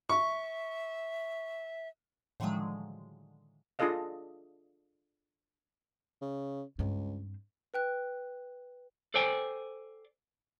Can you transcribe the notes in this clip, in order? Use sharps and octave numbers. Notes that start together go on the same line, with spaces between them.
E5 C#6
A2 D3 D#3 F3 F#3 G#3
D4 F4 G#4 A4 D#5 F5
C#3
C#2 G2 C4
B4 G5 F#6
A4 C5 D5 G5 G#5